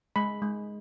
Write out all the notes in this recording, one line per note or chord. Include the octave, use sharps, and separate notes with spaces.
G#3 B5
G#3